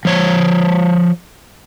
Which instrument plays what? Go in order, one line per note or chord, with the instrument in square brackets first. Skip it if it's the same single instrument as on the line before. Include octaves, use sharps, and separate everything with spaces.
[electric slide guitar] F3 C#5